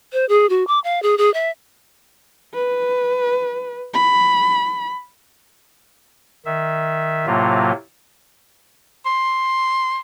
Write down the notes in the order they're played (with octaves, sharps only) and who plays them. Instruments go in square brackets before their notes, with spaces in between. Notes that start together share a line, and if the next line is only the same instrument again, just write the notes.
[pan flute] C5
G#4
F#4
D6
F5
G#4
G#4
E5
[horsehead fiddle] B4
B5
[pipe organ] D#3 E5
A2 C3 F#3 A#3 F4
[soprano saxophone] C6